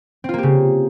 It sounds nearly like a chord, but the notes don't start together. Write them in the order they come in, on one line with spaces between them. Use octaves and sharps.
C4 F4 A#3 G4 C#3